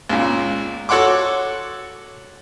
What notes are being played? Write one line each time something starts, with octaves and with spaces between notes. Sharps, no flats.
C#2 A#2
F#4 A4 C#5 F#5 C6 D6